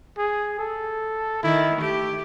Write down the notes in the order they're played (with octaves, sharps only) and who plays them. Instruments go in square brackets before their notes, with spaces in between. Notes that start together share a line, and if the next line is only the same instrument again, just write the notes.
[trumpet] G#4
A4
[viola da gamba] D#3 [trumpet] E4
[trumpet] A3 [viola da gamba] G4